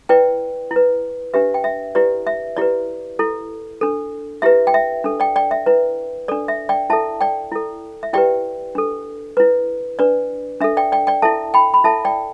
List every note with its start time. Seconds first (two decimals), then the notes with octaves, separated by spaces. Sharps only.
0.09 E4 B4 D5 G5
0.71 E4
0.76 B4
1.34 D4 G4 B4 E5
1.54 G5
1.64 E5
1.95 E4 G4 B4 D5
2.27 E5
2.57 E4 G4 B4 D5
3.19 E4 A4
3.81 D4 A4
4.42 E4 G4 B4 E5
4.67 G5
4.74 E5
5.04 D4 A4
5.20 D5 G5
5.36 D5 G5
5.51 E5
5.66 E4 B4
6.28 D4 A4 D5
6.48 E5
6.69 D5 G5
6.90 E4 A4 E5 A5
7.21 D5 G5
7.52 E4 A4
8.03 E5
8.13 E4 G4 B4 D5 G5
8.75 D4 A4
9.37 E4 B4
9.99 D4 B4 D5
10.61 D4 A4 E5
10.77 D5 G5
10.92 D5 G5
11.07 D5 G5
11.22 E4 A4 E5 A5
11.54 G5 B5
11.74 B5
11.84 E4 A4 E5 A5
12.05 D5 G5